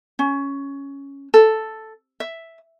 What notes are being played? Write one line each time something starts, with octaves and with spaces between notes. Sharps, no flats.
C#4
A4
E5